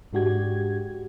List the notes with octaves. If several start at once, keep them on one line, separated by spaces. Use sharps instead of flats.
G#2 G#3 D4 F#4 G4 G#6